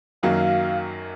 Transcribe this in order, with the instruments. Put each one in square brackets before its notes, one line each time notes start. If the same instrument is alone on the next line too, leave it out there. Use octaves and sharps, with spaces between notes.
[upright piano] F#2 D#3 F#3 A#3 [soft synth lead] F5